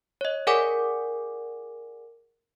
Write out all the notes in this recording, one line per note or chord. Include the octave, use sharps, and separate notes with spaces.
C#5 D#5
G#4 A#4 D5 F#5 G#5 D6